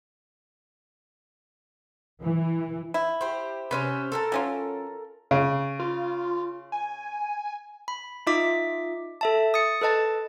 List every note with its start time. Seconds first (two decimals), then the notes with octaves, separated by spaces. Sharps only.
2.22 E3
2.94 E4
3.21 G4 C5
3.71 C3 C#4 B4 C5
4.12 A4 A#4 A5
4.32 F#3 C#4 F4
5.31 C#3
5.80 F4
6.72 G#5
7.88 B5
8.27 D#4 F4 D#5 E5 D6 B6
9.21 A4 E5 A5
9.54 D#6 A6 C#7
9.81 A4 B4 D#5 A5 A6